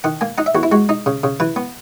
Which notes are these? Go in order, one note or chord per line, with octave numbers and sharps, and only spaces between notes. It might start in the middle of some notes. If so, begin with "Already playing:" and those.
D#3 F#5
A#3 G#5
D#4 F#5
E5
E2 F#4
E4
G#3 F#4
D#4
C#3
C#3
E3 B4
B3